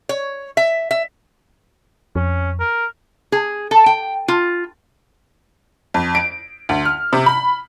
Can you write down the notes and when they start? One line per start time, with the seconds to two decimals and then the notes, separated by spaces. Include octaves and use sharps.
0.09 C#5
0.57 E5
0.91 E5
2.16 F2 C#4
2.60 A#4
3.32 G#4
3.71 A4
3.86 G5
4.28 F4
5.94 F2
6.15 D7
6.69 D2
6.85 F6
7.13 C3
7.26 B5